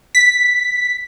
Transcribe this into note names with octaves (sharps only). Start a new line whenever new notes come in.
B6